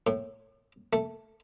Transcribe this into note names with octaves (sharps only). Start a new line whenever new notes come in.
A2
A3